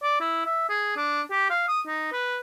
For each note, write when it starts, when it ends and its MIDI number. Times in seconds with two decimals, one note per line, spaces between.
0.03 0.20 74
0.20 0.45 64
0.46 0.69 76
0.69 0.93 68
0.97 1.22 62
1.31 1.50 67
1.50 1.66 77
1.68 1.81 87
1.87 2.10 63
2.12 2.38 71